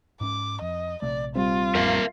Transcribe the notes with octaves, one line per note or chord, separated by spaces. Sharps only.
G#2 C#4 D6
F2 D#5
A#1 C3 A3 D5
G3 C4 F4
A1 F2 A#4 E5 F5